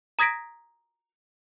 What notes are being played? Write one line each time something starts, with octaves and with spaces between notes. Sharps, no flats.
A#5 D#6 G#6 A#6 B6 D7